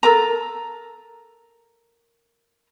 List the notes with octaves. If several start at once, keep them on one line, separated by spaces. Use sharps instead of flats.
A4 A#4 A#5